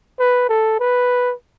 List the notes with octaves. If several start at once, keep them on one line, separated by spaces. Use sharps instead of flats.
B4
A4
B4